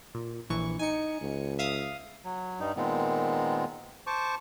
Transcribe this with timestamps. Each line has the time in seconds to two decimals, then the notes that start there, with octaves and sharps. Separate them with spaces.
0.15 A#2
0.50 A#1 E3 C#6
0.79 D#4 G#5 C#7
1.21 C#2
1.59 E5 F5 D#6
2.25 F#3
2.60 G2 G3 D#4
2.76 A#2 D#3 G#3 B3 C4
4.07 C5 A5 C#6 D6